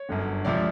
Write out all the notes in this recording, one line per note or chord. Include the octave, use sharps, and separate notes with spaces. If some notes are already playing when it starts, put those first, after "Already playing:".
Already playing: C#5
G1 F#2 D3
C#2 C3 F3 D5